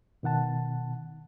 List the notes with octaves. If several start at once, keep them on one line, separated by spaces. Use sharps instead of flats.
B2 D#3 F#5 A5